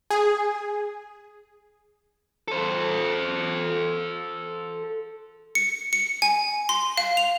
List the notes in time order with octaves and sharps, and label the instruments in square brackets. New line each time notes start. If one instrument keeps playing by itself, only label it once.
[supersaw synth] G#4
[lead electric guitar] A4 C5
[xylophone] C#7
C#7
G#5
C6
F5
F7